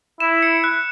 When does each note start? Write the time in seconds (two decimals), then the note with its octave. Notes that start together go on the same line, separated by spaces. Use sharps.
0.20 E4 E7
0.43 C#7
0.64 F#6